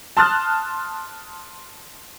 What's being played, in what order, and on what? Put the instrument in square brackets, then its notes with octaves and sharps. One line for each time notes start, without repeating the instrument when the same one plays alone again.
[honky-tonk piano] A5 C6 D#6 F6 F#6 A6